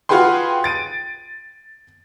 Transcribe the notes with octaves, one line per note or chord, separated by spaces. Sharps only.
F4 F#4 G#4 B4 G5 C6
A6 D7 D#7